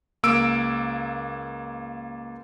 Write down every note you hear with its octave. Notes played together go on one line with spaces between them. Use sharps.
C#2 A#3 E6 D7